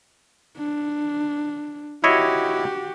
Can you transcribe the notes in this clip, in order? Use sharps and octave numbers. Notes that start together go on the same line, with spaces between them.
D4
E4 F#4 G4 C#5 D#5